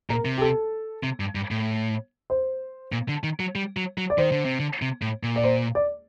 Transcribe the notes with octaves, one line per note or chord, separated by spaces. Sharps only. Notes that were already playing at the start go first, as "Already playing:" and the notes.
A#2 A#4
C3
G4
A4
C3
G2
G2
A2
C5
A#2
D3
D#3
F#3
G3
F#3
F#3
D5
D#3 C5
D3
C3
D3
C3
A2
A#2
D5
C5
D5